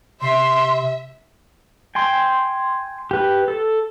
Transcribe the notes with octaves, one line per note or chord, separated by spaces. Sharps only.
C3 E5 C6
G5 G#5 C6
G4 B4
A4